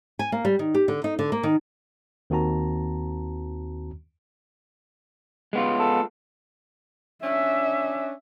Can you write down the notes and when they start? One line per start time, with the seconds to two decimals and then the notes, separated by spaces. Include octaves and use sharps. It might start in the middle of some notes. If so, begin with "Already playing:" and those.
0.19 G#5
0.32 A#3
0.45 G3
0.59 D#3
0.74 G4
0.88 D3
1.04 D#4
1.19 D3
1.32 A#3
1.43 D#3
2.30 D#2 D#3 C4 F#4 A5 A#5
5.53 G#3 B3 F4
5.79 A4
7.23 C#4 D4 E5